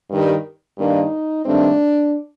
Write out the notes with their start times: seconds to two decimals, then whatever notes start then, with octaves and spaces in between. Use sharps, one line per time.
0.10 G2 D#3 G3
0.77 G2 D#3 A#3 D4 D#4
1.44 G2 D#3 A3 C4 D4